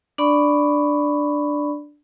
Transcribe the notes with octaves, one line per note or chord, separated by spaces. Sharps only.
D4 D5 B5 C#6